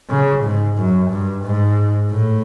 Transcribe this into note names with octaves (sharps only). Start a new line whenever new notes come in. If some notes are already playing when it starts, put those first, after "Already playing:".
C#3
G#2
F#2
G2
G#2
A2